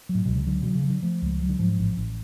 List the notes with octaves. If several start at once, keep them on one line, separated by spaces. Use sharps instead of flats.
F#3
A2
C#2 B2
C#3
D3 F#3
B2 F#3
C#3
F#3
D3
F3 A3
C#2
F#3
D3
G#2 F3
A1
A1